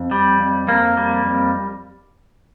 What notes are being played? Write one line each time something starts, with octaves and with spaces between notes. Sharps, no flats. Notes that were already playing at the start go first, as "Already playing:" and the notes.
Already playing: F2
G3
F2
F2 A#3
G3
F2